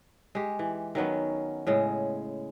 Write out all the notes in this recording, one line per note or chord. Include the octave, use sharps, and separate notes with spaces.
G#3 G4
E3
D#3 F#3 B3 C#4
A2 C#3 G#3